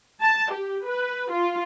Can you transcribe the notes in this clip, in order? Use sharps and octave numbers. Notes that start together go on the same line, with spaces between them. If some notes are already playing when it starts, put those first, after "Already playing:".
A5
G4
B4
F4